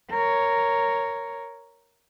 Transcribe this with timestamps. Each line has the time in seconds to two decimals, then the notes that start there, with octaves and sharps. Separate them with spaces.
0.11 A#4 C#5